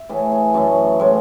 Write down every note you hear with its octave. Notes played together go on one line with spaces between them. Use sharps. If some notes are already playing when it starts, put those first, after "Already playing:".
Already playing: E5
A2 E3 A3 G#4
G#4
F#2 E3 A3
A2 G#3